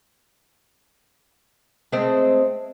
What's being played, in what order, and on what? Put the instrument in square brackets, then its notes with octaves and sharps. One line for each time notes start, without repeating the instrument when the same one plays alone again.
[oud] G#3 A3 C4